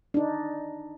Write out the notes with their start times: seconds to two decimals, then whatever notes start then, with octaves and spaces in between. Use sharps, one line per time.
0.14 D4 D#4